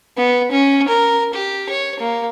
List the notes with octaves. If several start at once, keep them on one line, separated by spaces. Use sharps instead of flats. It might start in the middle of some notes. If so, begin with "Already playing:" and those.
B3
C#4
A#4
G4
C#5
A#3